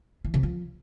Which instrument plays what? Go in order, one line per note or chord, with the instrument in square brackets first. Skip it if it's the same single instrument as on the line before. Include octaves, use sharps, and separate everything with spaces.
[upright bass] E3
C3
F3